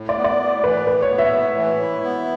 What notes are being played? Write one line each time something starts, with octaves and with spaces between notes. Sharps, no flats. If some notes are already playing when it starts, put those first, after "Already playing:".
Already playing: A2
D5
B3
D5
A2
E3 B4
A2 B4
C#5
B3
E5
A2
E3
E4
B3